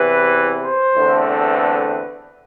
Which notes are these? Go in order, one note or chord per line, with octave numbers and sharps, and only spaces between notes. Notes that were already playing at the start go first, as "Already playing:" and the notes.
Already playing: E2 C3 E3 B4
C5
E2 D3 A3 C4
B4